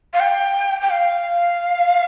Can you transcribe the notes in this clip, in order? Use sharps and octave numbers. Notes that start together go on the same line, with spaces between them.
F5
G5
G5
F5